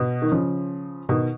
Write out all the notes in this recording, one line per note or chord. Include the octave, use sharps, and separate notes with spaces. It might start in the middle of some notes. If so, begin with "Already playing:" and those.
Already playing: B2
D#3
C#3 F3
B2 D#3